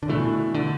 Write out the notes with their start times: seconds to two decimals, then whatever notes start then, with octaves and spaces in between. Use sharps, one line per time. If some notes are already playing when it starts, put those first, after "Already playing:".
0.03 D3
0.09 B2 E3 A3 D4
0.54 D3